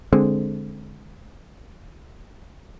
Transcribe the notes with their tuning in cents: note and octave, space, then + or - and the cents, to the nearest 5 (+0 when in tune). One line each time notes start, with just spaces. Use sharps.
D3 +0 G#3 +0 C4 +0